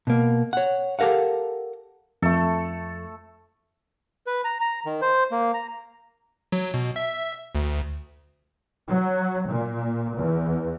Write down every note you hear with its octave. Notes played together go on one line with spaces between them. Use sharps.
B2 A#3
C#5 F#5
G4 A4 A#4 F5 F#5
F2 A3 A4
B4
A#5
A#5
D#3
C5
A#3
A#5
F#3
B2
E5
D2
F#3
A#2
E2